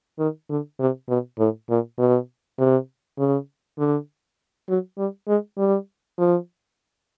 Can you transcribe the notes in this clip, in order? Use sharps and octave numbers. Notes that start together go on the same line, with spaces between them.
D#3
D3
C3
B2
A2
A#2
B2
C3
C#3
D3
F#3
G3
G#3
G3
F3